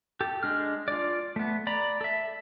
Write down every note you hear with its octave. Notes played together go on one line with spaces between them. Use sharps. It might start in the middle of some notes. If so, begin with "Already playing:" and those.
G4 A4
G#3 D4 F6
F4 D5
A3 B3
D5 A#5 B5
A4 E5